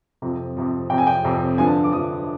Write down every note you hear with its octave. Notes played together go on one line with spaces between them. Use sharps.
F2 C3 F3
F2 C3 F3
F2 C3 F3 G5
G#5
G5
F2 C3 F3
G2 D3 F3 G#5
A5
D6
G2 D3 F3 D#6